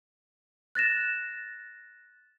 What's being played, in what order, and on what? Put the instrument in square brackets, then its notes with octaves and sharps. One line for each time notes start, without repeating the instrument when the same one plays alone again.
[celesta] F#6 A6 A#6 E7